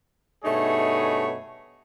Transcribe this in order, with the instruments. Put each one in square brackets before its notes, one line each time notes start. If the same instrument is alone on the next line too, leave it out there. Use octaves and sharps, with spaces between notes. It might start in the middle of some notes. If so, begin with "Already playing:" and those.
[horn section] G2 B2 A3 D#4 G#4 C#5